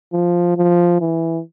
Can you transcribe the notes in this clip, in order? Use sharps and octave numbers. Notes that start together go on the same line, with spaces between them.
F3
F3
E3